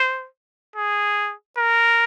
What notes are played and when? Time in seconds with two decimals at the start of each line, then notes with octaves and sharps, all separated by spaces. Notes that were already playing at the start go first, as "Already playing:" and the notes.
Already playing: C5
0.76 G#4
1.58 A#4